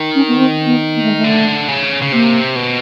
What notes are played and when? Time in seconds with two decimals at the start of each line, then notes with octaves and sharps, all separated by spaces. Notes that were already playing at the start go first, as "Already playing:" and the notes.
Already playing: D#3
0.15 C#4
0.28 B3
0.37 C4
0.66 B3
0.95 A#3
1.02 A3
1.10 G#3
1.16 A3
1.24 D3
1.68 C#3
2.02 C#3
2.12 C3 A#3
2.56 B2